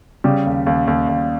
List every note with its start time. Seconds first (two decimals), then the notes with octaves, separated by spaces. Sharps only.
0.24 C#3 G3 G4
0.46 D#2
0.66 D#2
0.87 D#2
1.08 D#2